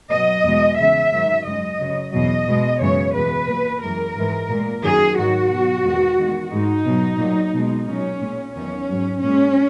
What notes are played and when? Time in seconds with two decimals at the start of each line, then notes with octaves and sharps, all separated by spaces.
0.10 B2 F#3 D#5
0.44 E2 B2 G#3
0.78 E2 C#3 G#3 E5
1.12 G#2 D#3 F#3
1.45 F#2 C#3 G#3 D#5
1.79 F#2 C#3 F#3
2.13 E2 B2 F#3 D#5
2.47 B2 G#3
2.81 F#2 C#3 E3 G#3 C#5
3.15 E2 B2 G#3 B4
3.48 A#2 F#3
3.83 F#2 E3 G#3 A#4
4.16 G#2 E3 G#3
4.50 A#2 G#3
4.83 F#2 D#3 F#3 G#4
5.17 G#2 D#3 F#3 F#4
5.51 B2 F#3
5.85 E2 D#3 G#3
6.18 E2 D#3 G#3
6.52 G#2 D#3 G#3 D#4
6.86 B2 F#3
7.20 A#2 F#3
7.54 B2 G#3
7.87 A#2 F#3 C#4
8.21 A#2 G#3
8.54 E2 D#3 F#3 C#4
8.89 G#2 F#3
9.23 A#2 G#3 C#4